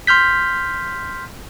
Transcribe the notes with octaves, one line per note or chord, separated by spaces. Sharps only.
C6 F6 G6 B6